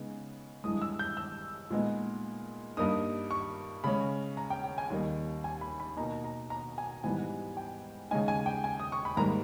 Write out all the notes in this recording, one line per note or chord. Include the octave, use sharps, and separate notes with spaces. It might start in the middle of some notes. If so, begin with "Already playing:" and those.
Already playing: C#3 G#3 B3 D#4
G2 E3 G#3 D#6
E6
G6
E6
A#2 G#3 B3 D#4
G2 G3 A#3 D#4 D#6
C#6
C#3 G#3 C#4 B5
A#5
G5
G5
G#5
D#2 D#3 G3 A#3 D#4
G#5
B5
B5
B2 A#3 D#4 A#5
A#5
A#5
G#5
G#2 E3 G3 B3 D#4 G#5
G5
C#3 G#3 D#4 G#5
G#5
G5
G#5
D#6
C#6
B5
G#2 G3 A#3 A#5